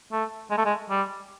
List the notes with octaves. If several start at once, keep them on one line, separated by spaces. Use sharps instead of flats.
A3
G#3
A3
G#3
G3